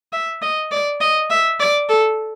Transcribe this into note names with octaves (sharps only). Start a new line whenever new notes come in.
E5
D#5
D5
D#5
E5
D5
A4